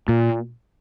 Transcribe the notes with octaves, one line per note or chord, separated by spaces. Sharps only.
A#2